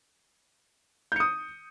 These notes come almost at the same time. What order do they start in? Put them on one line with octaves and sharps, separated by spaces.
G6 C#7 D#6